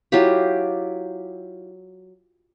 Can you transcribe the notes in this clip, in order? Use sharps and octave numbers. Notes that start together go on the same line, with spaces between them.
F#3 E4 F4 G4